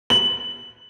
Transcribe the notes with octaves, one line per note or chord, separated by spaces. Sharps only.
F#7